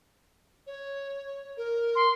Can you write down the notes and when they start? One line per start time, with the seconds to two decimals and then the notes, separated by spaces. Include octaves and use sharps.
0.67 C#5
1.57 A#4
1.96 C6